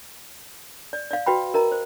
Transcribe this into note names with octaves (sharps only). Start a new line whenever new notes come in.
D5
D5 F5
F#4 B4 G5 B5
A#4 D#5 A#5
C5